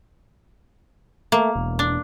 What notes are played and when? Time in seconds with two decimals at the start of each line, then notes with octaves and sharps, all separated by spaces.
1.32 A3 A#3
1.56 E1
1.79 D4